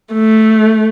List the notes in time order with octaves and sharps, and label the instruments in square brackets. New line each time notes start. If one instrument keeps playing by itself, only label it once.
[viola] A3